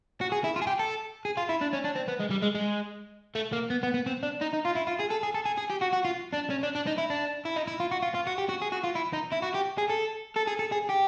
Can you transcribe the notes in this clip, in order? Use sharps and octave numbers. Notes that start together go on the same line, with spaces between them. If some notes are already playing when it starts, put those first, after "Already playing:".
F#4
G#4
E4
F4
G#4
G4
A4
G#4
F4
E4
D4
C#4
D4
C4
B3
G#3
G3
G#3
G#3
A3
A#3
B3
B3
B3
C4
D4
D#4
D#4
F4
E4
F4
G#4
A4
G#4
A4
G#4
G#4
G4
F#4
F#4
F4
D4
C#4
D4
D4
D#4
E4
D4
E4
D#4
E4
F4
F#4
F4
F4
F#4
G4
F#4
G#4
F#4
F4
E4
D#4
E4
F#4
G4
G#4
A4
A4
G#4
A4
G#4
G4